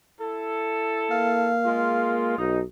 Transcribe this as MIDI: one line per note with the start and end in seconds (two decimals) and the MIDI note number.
0.20 1.54 64
0.20 1.54 69
1.11 2.34 58
1.11 2.49 77
1.65 2.34 56
1.65 2.34 65
2.38 2.62 35
2.38 2.59 63